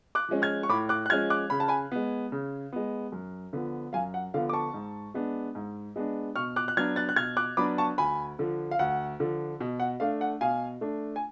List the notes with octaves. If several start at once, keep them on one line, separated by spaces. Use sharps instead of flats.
D6 F#6
F3 G#3 C#4
F6 G#6
C#6
A2 B5 D6
D6 F#6
F#6
F3 G#3 C#4 F6 G#6
D6 F#6
C#3 B5
A5
G#5 B5
G#3 B3
C#3
G#3 B3
F#2
D3 F3 B3
F#2 F5 G#5
F#5
D3 F3 B3 F5
D6
A5 C#6
G#2
G#3 B3 D4
G#2
G#3 B3 D4
B2 C#6 F6
D6 F#6
F#6
F#3 B3 D4 F6 G#6
F#6 A6
F#6
B2 F6 G#6
D6 F#6
F#3 B3 D4 B5 D6
A5 C#6
D2 G#5 B5
D3 F3
F5
D2 F#5
D3 F3
B2
F#5
A3 D4 F5
F#5
B2 F5 G#5
A3 D4
G#5